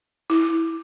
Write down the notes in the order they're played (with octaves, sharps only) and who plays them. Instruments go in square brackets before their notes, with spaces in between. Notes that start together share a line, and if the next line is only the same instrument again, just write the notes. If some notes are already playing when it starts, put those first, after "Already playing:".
[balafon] E4